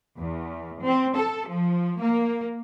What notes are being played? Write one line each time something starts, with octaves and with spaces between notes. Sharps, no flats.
E2
C4
A4
F3
A#3